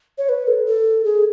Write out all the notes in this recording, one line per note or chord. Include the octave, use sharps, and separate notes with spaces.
C#5
B4
A4
A4
G#4